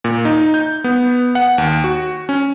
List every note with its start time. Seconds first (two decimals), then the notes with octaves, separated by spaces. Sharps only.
0.04 A#2
0.25 D#4
0.54 G6
0.84 B3
1.35 F#5
1.58 D#2
1.84 F#4
2.29 C#4